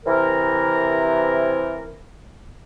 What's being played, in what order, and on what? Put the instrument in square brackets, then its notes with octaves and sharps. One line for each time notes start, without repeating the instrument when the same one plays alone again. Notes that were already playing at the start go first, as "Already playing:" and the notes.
[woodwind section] C3 E3 A#4